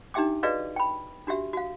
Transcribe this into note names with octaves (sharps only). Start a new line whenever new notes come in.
D4 D#4 G4 E5 G5 D6
F#4 G#4 B4 D5 D#5 F5
G5 B5
D4 F#4 G4 E5
F#4 F5